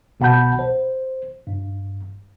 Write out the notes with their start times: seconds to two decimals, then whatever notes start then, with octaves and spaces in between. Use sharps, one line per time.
0.20 C2 B2 F#5 A5 B5 G6
0.59 C5
1.47 G2